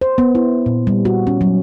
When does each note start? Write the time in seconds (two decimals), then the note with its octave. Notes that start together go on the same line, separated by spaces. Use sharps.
0.01 C5
0.18 B3
0.35 E4
0.66 A#2
0.87 G3
1.05 F#4
1.27 C#4
1.41 F#3